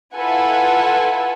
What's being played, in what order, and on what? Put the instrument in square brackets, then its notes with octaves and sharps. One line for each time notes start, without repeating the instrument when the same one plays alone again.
[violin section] E4 F4 A4 B4 F#5 G#5